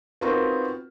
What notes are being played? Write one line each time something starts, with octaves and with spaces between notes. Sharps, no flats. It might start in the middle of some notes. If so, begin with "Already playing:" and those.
B3 C4 D#4 F4 F#4 A#4